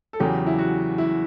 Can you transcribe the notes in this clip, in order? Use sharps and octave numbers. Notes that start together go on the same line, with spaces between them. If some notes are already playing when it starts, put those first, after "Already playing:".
A4
E2 C#3 F#3 G4
E4
F#4
E4